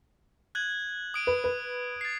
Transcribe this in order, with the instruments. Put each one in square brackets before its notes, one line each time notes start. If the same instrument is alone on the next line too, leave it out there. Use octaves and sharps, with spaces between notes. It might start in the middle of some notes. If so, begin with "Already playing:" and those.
[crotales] F#6 G#6 F#7
D#6 D7 D#7
[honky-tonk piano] B4
B4
[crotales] A6 C7